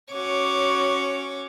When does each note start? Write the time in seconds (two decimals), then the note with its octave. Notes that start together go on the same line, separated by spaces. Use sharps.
0.12 C#4 F#4 C#5 D6